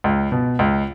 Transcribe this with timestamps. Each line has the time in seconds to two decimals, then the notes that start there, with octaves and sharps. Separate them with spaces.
0.04 C#2
0.32 B2
0.59 C#2